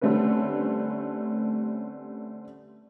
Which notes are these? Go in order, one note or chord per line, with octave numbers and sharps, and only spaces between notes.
D3 G3 A3 C4 C#4 B4